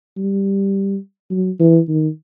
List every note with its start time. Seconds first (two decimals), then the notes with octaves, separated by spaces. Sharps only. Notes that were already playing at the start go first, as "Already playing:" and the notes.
0.17 G3
1.31 F#3
1.60 E3
1.88 D#3